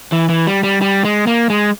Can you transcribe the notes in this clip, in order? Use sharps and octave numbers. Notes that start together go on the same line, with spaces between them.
E3
E3
G3
G3
G3
G#3
A#3
G#3